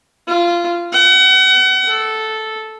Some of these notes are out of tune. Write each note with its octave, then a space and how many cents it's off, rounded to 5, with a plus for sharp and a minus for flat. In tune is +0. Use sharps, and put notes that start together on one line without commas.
F4 -15
F#5 +35
A4 -5